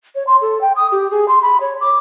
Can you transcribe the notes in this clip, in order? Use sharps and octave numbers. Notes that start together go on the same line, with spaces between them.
C#5
C6
A4
G5
D#6
G4
G#4
C6
B5
C#5
D6